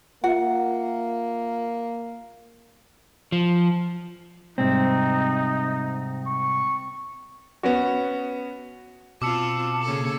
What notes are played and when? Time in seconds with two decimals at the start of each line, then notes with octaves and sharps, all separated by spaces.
0.24 A#3 F4 E5 F#5
3.32 F3
4.58 G#2 C3 G3 C4 D#4
6.27 C#6
7.63 B3 C#4 F#4
9.22 B2 C4 F4 A5 D6 E6 C#7
9.82 C#3 A#3 A4